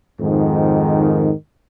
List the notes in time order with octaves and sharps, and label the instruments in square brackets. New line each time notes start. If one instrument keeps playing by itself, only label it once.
[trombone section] F2 G#2 D#3